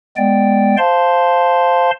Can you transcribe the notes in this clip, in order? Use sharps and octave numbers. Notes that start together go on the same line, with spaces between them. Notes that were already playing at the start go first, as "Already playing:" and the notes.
G#3 B3 D5 G5
C5 F5 A5 C6